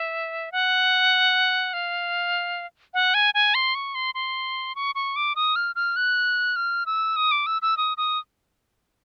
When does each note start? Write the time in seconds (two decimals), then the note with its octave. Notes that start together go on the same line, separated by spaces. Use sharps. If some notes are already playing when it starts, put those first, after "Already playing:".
Already playing: E5
0.52 F#5
1.73 F5
2.94 F#5
3.14 G#5
3.34 G#5
3.55 C6
3.75 C#6
3.95 C6
4.15 C6
4.75 C#6
4.95 C#6
5.16 D6
5.36 D#6
5.56 F6
5.76 F6
5.96 F#6
6.56 F6
6.86 E6
7.16 D#6
7.31 D6
7.46 E6
7.62 E6
7.77 D#6
7.97 D#6